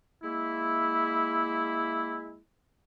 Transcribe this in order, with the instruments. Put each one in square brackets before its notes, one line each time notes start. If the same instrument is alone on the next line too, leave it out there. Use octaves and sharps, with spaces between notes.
[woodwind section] G#3 A#3 E4